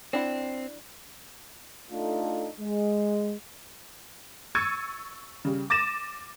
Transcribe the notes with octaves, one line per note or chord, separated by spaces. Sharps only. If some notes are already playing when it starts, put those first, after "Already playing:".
C4 D4 E4 F#5
A3 D4 D#4 F4 A4
G#3
C#6 E6 G#6 A6 C#7 D#7
C#3 G3
D6 A6 A#6 D#7 E7